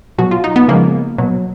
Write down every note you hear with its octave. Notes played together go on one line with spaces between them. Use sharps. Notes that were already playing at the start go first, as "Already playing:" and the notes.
B2 F#3 F#4
F4
D#4
B3
C#3 F3 G#3 A#3
B2 F#3